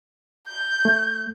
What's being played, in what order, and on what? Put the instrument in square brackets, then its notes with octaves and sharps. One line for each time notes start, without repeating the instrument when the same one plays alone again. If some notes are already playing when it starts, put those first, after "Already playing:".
[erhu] G6
[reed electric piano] A3